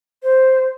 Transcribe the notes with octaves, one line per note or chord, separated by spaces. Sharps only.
C5